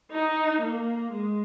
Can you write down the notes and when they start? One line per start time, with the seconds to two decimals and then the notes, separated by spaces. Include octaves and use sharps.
0.12 D#4
0.63 A#3
1.13 G#3